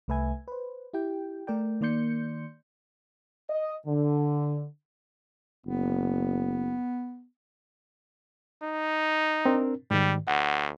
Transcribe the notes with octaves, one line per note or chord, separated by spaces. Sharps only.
C2 A3 B4 E5 G#5 G#6
B4 C5
E4 G4 G5
A3 A#4 D5 G5
D#3 A#3 D5 C6 G6 C#7
D#5
D3
F#1 B3
D#4
C4 D4 A#4
G#2 D#3 G3
D2 F#5